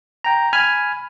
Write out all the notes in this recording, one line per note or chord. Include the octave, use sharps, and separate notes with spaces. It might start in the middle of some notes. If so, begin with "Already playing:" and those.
G5 A#5
G#5 B5 F6